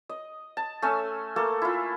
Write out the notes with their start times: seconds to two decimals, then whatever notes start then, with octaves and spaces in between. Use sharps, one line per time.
0.09 D#5
0.57 A5
0.82 A3 C#4 G#5 E6
1.36 A3 A#3 A4
1.62 E4 F4